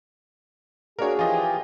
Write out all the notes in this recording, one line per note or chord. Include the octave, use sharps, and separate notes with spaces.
A#3 D4 F#4 G#4 A#4 C#5
E3 F3 F4 G4 D#5 G#5